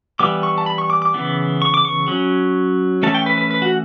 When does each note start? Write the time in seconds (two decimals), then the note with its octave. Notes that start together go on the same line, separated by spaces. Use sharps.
0.19 E3 G3 B3 D6
0.43 C#6
0.58 A5
0.66 B5
0.78 C#6
0.90 D6
1.02 D6
1.14 C#3 E3 B3
1.62 C#6
1.74 D6
1.85 C#6
2.08 F#3 C#4
3.03 E3 A3 C#4 A5
3.15 G5
3.26 B4
3.38 B4
3.51 B4
3.62 F#4